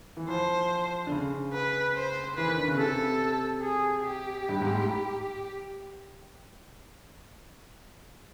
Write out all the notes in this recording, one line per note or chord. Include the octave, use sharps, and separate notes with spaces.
E3
F3 C5
D3
C#3
B4
C5
E3 B4
D#3
D3
C#3
C3 A4
G#4
G4
G2
G#2
A2